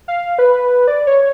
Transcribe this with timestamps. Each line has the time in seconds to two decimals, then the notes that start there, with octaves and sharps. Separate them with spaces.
0.08 F5
0.38 B4
0.88 D5
1.07 C#5